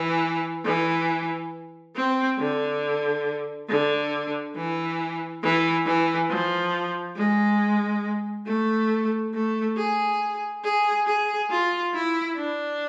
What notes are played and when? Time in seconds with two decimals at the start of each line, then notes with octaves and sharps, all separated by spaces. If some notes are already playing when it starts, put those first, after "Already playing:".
Already playing: E3
0.65 E3
1.96 C4
2.39 D3
3.69 D3
4.56 E3
5.43 E3
5.86 E3
6.29 F3
7.16 G#3
8.46 A3
9.34 A3
9.77 G#4
10.64 G#4
11.07 G#4
11.51 F4
11.94 E4
12.37 D4